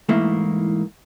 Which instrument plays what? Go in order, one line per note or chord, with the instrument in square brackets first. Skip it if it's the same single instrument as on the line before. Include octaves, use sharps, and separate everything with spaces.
[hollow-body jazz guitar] G#2 E3 A3 A#3 E4